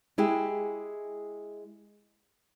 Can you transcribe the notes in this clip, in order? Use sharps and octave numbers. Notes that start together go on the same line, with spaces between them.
G#3 E4 G4 G#4